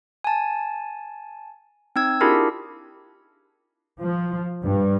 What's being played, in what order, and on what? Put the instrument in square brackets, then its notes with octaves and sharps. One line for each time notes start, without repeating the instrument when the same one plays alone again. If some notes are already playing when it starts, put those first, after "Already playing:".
[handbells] G#5 A5
C4 D#4 E6 G#6
D4 E4 F4 G4 G#4 A#4
[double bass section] F3
G2